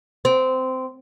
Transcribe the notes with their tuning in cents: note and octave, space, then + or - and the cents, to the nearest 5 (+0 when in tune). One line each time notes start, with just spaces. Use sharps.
C4 -15